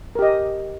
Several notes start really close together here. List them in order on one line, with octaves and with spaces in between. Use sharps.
A#4 G4 D#5